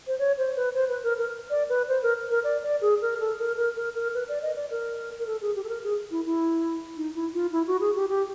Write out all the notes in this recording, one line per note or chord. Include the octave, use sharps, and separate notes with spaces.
C5
C#5
C5
B4
C5
B4
A#4
A#4
D5
B4
C5
A#4
A#4
D5
D5
G#4
A#4
A4
A#4
A#4
A#4
A#4
B4
D5
D#5
D5
A#4
A#4
A4
G#4
G4
A4
A#4
G#4
E4
E4
D#4
E4
F4
E4
F#4
G#4
G4
G4